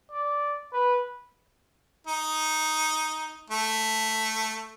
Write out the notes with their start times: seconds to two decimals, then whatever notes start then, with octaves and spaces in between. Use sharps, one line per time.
0.12 D5
0.73 B4
2.07 D#4
3.50 A3